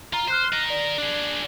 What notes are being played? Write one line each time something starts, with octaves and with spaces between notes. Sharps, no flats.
F4 A#5
C5 F6 F#6 C7
A#4 D#5
D5
D4 G#4